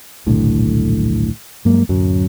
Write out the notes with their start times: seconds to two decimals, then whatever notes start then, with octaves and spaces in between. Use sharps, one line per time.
0.26 D#1 B1 A2 D3
1.65 G2 F#3 G#3 A#3
1.89 D1 F#2 F#3